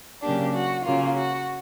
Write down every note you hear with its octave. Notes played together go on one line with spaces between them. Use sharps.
C#3 F#3 A#3 D4 G4
F#4
C#3 F#3 A#3 F4
F#4